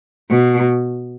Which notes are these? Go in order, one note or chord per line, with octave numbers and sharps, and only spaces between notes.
B2